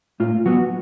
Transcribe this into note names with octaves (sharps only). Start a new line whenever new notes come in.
A2 F4
F#3 B3 F#4